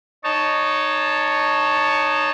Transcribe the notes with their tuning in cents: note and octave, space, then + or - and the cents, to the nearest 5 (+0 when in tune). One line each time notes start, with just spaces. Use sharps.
D#4 -20 C#5 +5 A5 +0